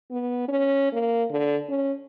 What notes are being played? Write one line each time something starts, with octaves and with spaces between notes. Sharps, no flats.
B3
C#4
A#3
D3
C#4